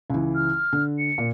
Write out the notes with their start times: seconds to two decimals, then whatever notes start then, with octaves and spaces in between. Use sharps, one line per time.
0.10 C#2 E3
0.35 F6
0.73 D3
0.99 C#7
1.18 A#2